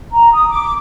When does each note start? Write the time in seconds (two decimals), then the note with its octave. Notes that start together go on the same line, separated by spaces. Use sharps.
0.12 A#5
0.33 D#6
0.49 D6